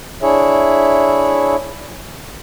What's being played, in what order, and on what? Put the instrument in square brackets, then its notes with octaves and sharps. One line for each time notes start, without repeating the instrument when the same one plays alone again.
[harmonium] D4 E4 G#4 C#5 E5